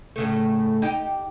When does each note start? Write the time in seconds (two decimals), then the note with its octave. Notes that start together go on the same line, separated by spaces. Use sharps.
0.16 A2 C#3 A3
0.82 D#4 G4